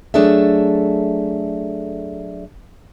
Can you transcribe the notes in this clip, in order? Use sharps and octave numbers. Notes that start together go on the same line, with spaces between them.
F#3 A3 D4 G#4 A4 E5